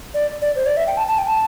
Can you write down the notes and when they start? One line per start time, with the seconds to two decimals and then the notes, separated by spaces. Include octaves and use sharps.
0.14 D5
0.42 D5
0.56 C5
0.66 D5
0.77 E5
0.87 G5
0.97 A5
1.07 A5
1.18 G5
1.28 A5